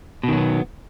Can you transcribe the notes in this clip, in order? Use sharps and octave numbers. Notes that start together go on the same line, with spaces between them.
B2 D#3 F#3 B3